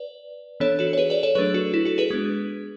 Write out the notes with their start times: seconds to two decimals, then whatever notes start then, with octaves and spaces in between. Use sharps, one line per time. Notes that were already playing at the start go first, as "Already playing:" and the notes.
Already playing: B4 D5
0.60 E3 B3 D4 A4 C#5
0.79 F#4 A4
0.93 C#5
0.98 G#4 B4
1.10 B4 D5
1.23 A4 C#5
1.35 F#3 A3 D4 G#4 B4
1.54 F#4 A4
1.74 E4
1.85 F#4 A4
1.98 G#4 B4
2.10 G#3 B3 D4